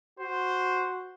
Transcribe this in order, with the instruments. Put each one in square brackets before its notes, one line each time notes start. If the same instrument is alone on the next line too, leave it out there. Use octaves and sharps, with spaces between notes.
[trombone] F#4 [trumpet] C5